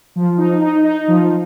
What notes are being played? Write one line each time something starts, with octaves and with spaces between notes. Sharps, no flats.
F3
D#4
D#4
D#4
F3